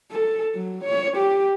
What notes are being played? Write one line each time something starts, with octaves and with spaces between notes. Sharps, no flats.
A4
F#3
C#5
G4